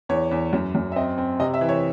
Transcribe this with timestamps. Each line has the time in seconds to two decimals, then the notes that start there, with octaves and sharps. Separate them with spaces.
0.09 E2 C#5
0.31 E2
0.53 F#2
0.75 F#2
0.92 E5
0.96 C4 D#5
1.18 C4
1.40 C3 D#5
1.54 E5
1.61 E3
1.69 C#5